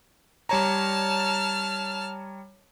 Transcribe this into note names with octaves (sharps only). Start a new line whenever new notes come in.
G3 C#5 A5 A#5 F6